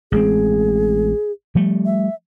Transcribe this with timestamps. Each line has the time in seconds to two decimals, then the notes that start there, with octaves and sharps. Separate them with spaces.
0.12 A1 G#3 C4 G#4
1.55 F3 G3 A3
1.85 E5